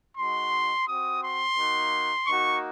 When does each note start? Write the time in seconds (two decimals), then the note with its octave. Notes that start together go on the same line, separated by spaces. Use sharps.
0.17 G#3 D#4 F#4 C6
0.88 C4 F#4 D#6
1.23 C6
1.57 A#3 D#4 F#4
2.27 A#3 D#4 F#4 C#6